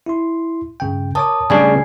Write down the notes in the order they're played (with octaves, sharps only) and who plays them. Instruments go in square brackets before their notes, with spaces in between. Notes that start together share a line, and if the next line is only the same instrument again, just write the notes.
[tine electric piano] E4 C6
G2 C#3 G5
[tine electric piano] A#4 C#5 D6 [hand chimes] A5 D#6
[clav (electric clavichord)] C#3 G3 D4 [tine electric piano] A3 G#4 [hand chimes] G#5 G#6 C7